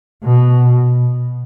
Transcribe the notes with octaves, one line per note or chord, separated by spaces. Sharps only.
B2